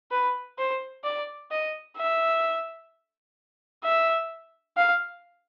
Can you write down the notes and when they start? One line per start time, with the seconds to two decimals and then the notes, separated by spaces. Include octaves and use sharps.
0.11 B4
0.58 C5
1.04 D5
1.51 D#5
1.97 E5
3.84 E5
4.77 F5